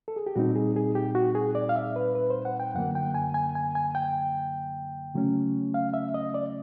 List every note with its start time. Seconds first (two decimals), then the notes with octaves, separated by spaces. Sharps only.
0.08 A4
0.16 G#4
0.26 G4
0.36 A#2 G3 C4 D#4 F#4
0.56 G#4
0.76 G#4
0.95 G4
1.15 F#4
1.35 G#4
1.55 D5
1.69 F5
1.76 E5
1.96 B4
2.15 B4
2.30 C5
2.45 F#5
2.60 G5
2.75 F#2 D3 F#3 A#3 F#5
2.95 G5
3.15 G#5
3.34 G#5
3.55 G#5
3.75 G#5
3.95 G5
5.14 C#3 F#3 A3 C#4
5.74 F5
5.94 E5
6.14 D#5
6.34 D5